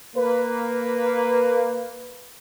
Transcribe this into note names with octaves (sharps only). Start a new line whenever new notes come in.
A#3 B4